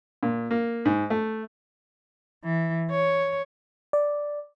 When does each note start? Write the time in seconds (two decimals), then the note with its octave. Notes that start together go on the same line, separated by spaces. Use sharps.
0.23 A#2
0.51 A#3
0.85 G#2
1.10 A3
2.44 E3
2.91 C#5
3.93 D5